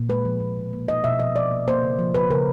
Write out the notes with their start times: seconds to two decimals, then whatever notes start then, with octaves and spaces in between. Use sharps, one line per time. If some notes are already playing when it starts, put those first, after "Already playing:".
Already playing: A#2
0.09 G#3 B4
0.25 F3
0.40 A#2
0.57 B2
0.73 A#3
0.88 B2 D#5
1.04 B2 E5
1.19 F3 D#5
1.35 F3 D5
1.51 A#3
1.68 A#3 C5
1.83 C#3
1.99 F3
2.14 C#3 B4
2.30 C#3 A#4